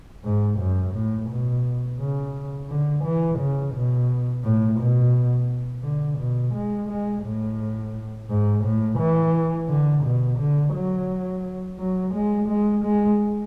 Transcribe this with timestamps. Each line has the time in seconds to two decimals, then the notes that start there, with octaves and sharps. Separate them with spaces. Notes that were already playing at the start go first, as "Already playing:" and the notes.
0.24 G#2
0.59 F#2
0.94 A2
1.29 B2
1.99 C#3
2.69 D3
3.04 E3
3.39 C#3
3.74 B2
4.44 A2
4.79 B2
5.84 D3
6.19 B2
6.54 G#3
6.89 G#3
7.24 A2
8.29 G#2
8.64 A2
8.99 E3
9.69 D3
10.04 B2
10.39 D3
10.74 F#3
11.79 F#3
12.14 G#3
12.48 G#3
12.84 G#3